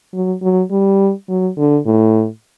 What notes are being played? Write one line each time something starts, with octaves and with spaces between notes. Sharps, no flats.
F#3
F#3
G3
F#3
D3
A2